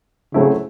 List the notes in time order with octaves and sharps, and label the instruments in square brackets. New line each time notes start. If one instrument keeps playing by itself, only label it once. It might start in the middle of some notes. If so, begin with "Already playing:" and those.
[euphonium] C#3 [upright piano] F#3 A3 C4 E4